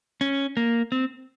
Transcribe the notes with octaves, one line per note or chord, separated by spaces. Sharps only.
C#4
A#3
C4